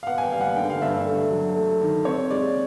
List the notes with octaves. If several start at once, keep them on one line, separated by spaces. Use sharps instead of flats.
F5
B3 F#5
G#5
G5
G3 F5
F#5
D3 G5
F5
G2 E5
E5
A3
F#3
A3
D#3
C4 C#5
G#3 D5